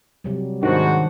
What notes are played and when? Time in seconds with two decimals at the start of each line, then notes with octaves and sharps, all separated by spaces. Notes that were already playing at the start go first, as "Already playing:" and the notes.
0.24 C3 F#3 G3
0.63 G#2 D#3 D4 F#4 C5 F#5